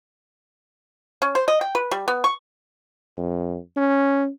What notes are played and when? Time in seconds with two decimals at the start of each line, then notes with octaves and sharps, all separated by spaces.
1.22 C#4
1.35 C5
1.48 D#5
1.61 G5
1.75 B4
1.91 G3
2.08 B3
2.24 C#6
3.17 F2
3.77 C#4